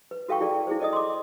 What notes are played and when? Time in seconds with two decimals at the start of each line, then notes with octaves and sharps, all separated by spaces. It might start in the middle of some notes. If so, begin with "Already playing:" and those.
0.11 B4
0.29 F#4 A4 F5 G5 C#6
0.40 E4 G#4 D5
0.67 E4 G#4 C5
0.80 A4 D5 D#5 D#6
0.93 C6 D6